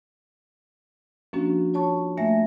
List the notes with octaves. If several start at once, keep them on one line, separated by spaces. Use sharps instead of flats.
F3 A#3 C#4 D4 F#4
F4 C#5 A5 C#6
A3 A#3 E5 G#5 A#6